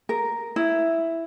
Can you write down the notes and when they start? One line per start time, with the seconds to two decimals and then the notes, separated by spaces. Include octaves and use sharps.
0.09 A#4
0.56 E4